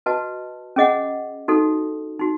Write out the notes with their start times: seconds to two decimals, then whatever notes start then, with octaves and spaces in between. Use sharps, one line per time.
0.06 F#4 B4 D#5 A5
0.76 C#4 G#4 D#5 F#5
1.48 D#4 F#4 A4
2.19 D#4 F#4